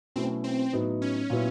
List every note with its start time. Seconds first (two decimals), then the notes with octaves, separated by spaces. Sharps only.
0.16 B2 F#3 A3 C4 C#4 E4
0.44 C4
0.73 A2 F#3 B3 D#4
1.02 C#4
1.30 A#2 F#3 B3 E4